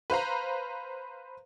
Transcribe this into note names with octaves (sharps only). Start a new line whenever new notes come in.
B4 C5 F5 A#5